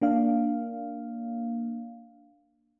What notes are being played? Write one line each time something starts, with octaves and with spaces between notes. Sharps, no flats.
A#3 D4 F5